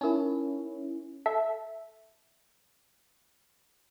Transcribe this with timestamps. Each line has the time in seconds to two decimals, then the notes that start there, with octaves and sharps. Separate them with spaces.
0.01 C#4 D#4 E4 A#4
1.26 A4 E5